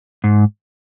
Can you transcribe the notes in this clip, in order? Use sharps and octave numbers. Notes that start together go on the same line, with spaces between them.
G#2